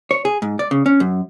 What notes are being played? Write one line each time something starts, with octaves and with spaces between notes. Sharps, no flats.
C#5
G#4
G#2
D5
C#3
C#4
F#2